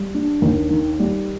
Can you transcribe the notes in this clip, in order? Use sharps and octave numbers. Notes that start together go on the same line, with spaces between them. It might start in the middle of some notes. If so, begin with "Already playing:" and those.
Already playing: G3
D4
D#2
D#3
G3